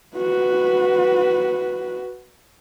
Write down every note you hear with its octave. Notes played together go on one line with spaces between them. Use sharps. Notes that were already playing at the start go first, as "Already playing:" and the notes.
F#4 B4